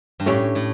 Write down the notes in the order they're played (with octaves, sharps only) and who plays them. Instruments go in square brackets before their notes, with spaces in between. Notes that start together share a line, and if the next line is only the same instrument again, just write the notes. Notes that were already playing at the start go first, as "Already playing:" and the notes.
[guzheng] G2
[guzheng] A2 [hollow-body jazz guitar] A3 C#4 G4 C#5
[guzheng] A2